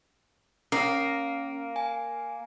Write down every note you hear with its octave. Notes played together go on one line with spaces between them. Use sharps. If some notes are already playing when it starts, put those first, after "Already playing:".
A#3 C#4
G#5